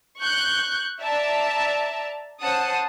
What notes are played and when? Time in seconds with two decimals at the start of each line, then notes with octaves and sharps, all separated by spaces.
0.18 C#6 F#6 G6
1.01 D5 E5 A5 A#5
2.40 C#4 C5 F#5 A5 D#6